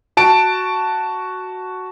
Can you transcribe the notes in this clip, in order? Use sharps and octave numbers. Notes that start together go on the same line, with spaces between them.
F#4 A5 D7